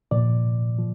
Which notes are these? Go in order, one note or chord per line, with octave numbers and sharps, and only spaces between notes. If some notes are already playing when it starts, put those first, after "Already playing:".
A#2 F3 D5
F3